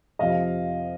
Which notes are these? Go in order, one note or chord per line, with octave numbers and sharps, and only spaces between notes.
F2 C3 F3 D#5 F5